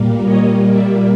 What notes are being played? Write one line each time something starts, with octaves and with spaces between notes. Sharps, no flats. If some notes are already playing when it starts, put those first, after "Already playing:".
Already playing: A#2 G3 A#3
C#5 D#5
D5 E5